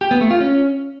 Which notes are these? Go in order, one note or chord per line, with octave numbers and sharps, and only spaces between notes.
G4
B3
A3
F4
C#4